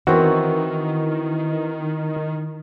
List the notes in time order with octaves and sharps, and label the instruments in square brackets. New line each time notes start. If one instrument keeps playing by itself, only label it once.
[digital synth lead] D#3 [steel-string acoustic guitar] E3 B3 [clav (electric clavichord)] C4 F#4 [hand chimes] E4 A#4 C#6